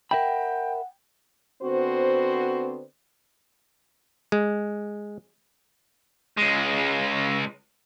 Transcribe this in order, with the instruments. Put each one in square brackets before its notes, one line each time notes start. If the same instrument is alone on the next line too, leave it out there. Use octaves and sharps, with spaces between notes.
[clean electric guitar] A#4 E5 B5 [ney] F#5 [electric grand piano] G5
[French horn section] D3 B3 C4 F#4 C5
[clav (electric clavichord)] G#3
[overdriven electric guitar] C#2 G#3